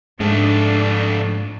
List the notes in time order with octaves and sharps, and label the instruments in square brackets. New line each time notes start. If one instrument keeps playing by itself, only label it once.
[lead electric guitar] F2 A3 [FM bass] G#2 [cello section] D4